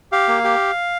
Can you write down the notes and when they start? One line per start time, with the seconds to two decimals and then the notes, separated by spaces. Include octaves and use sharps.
0.12 G4 F5
0.28 A#3
0.44 G4